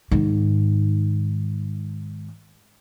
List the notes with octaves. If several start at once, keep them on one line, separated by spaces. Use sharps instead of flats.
G#2 D#3